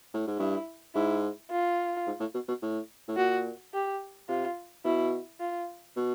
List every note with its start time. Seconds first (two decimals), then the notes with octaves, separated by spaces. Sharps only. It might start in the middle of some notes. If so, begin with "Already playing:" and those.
0.14 A2
0.27 G#2
0.39 G2 E4
0.95 G#2 E4
1.50 F4
2.07 G#2
2.20 A2
2.34 B2
2.48 B2
2.62 A2
3.08 A2
3.17 A#2 F#4
3.73 G4
4.29 C3 F4
4.85 B2 E4
5.40 F4
5.96 B2